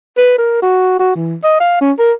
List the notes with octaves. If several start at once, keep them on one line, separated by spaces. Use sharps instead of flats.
B4
A#4
F#4
F#4
E3
D#5
F5
C#4
A#4